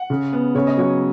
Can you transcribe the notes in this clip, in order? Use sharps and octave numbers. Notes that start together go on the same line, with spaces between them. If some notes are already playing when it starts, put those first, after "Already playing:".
Already playing: F#5
C#3
B3
C#3 C#5
D#5
F#3 C#5